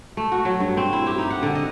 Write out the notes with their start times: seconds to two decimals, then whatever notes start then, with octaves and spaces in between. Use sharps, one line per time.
0.17 A3
0.32 F#4
0.45 F#3
0.60 G2
0.77 C4
0.93 E4
1.06 G4
1.18 D#4
1.30 F#5
1.43 D3
1.55 D#5